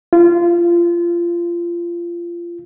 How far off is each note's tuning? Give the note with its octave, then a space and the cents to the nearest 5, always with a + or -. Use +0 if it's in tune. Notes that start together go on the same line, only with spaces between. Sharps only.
F4 -25